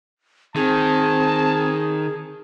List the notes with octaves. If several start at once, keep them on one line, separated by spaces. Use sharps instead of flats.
D#3 C4 G#4 A5